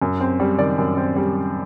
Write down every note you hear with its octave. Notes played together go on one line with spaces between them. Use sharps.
F#2
C4
G3
D#3 D5
F#2
C4
G3